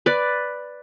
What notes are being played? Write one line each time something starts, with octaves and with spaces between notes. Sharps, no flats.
B4 D5